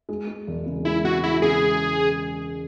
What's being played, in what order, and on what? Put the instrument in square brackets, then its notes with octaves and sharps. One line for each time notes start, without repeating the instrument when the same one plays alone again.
[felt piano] G#3
G#3
E1
C#3
[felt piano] G#3 [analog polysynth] E4
[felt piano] C#3 [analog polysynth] F#4
[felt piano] G#3 [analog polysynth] E4
[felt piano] C#3 [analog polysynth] G#4